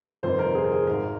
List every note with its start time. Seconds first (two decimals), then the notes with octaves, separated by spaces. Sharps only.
0.23 G1 F2 C3 D#3 C5
0.39 A#4
0.55 G#4
0.64 A#4
0.72 G#4
0.87 G#1 G#2 D#3 A#4